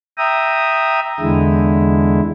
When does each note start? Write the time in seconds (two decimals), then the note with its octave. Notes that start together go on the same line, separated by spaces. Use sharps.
0.18 E5 G5 A#5 D#6
1.20 E2 D3 G#3 E4